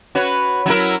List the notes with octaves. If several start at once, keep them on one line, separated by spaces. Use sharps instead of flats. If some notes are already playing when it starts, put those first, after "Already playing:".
F#4 B4 C#5
F#3 E4 A#4